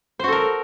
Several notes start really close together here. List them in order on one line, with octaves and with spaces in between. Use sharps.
C5 F#4 A4 A#4